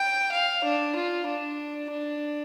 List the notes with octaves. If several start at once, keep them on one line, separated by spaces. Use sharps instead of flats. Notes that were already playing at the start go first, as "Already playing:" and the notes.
Already playing: G5
F5
D4
F4
D4
D4